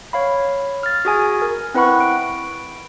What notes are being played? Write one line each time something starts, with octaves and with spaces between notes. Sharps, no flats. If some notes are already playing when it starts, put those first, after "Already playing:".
C#5 F5 B5
F6 A6
F#4 G#4 G#5
A#4
C4 E4 B4 F#5 B5 C#6
D7